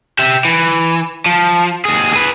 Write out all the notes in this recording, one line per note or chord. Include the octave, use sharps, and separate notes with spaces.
G4 E5
E3
F3
D#2 G#4
G#4 B4